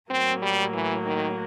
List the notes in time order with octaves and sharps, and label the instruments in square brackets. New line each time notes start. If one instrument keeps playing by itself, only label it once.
[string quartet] A2 F#3 A#3 [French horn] C4
[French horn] G3
E3
D#3